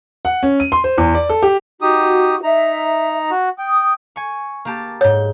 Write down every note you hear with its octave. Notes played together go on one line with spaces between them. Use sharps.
F#5
C#4
D#7
C6
C5
E2
D5
A4
G4
D#4 F#4 G4 D#6
D#4 E5 A#5
F#4
G5 D#6
G#5 C#6
A#3 G4 A5
G#2 C#5 G6